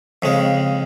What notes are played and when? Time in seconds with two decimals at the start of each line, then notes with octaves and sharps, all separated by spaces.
0.22 F2 C#3 G#3